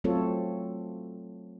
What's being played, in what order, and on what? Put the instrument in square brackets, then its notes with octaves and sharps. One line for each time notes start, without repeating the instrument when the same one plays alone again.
[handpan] F#3 A3 C4 F4 A4 C#5